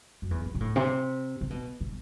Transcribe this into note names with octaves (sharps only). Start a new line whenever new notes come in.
F#2
E2
F#2
B2
A2
C3
C3
B2
B2